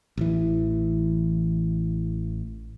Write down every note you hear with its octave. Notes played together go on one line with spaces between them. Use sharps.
A1 E3